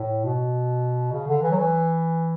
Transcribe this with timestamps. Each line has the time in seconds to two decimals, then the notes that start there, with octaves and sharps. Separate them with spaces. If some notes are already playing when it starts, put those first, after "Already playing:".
Already playing: A2
0.25 B2
1.13 C#3
1.27 D3
1.43 E3
1.51 F#3
1.57 E3